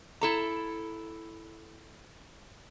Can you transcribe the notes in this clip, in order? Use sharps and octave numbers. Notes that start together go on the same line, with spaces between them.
E4 A4 A#5